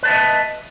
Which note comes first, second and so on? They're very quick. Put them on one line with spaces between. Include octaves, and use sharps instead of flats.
B4 A5 E5 D#5